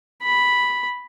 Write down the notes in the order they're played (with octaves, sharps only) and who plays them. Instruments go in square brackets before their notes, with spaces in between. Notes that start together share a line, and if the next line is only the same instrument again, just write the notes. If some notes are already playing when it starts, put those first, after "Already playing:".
[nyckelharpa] B5